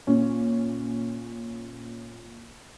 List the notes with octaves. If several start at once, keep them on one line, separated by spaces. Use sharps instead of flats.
A#2 C#4